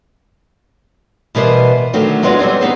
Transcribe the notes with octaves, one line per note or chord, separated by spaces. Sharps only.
B2 E3 G3 B3 A#4 C5
D3 D#3 F#3 A3 C4
F#3 G#3 B3 D4 F4 F#4
F#3 G3 B3 C4
B3 D#4 G#4 C5